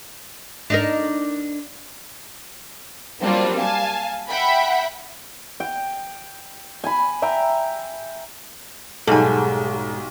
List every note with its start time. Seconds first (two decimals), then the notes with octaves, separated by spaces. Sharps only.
0.70 D4 D#4 A#4
3.23 F#3 G3 A#3 C4 D4 F4
3.60 F5 G#5 A5
4.29 E5 F#5 G5 B5
5.60 G5
6.84 G#5 B5
7.22 E5 G5 A#5
9.07 B1 G#2 G3 G#4 A4 G#5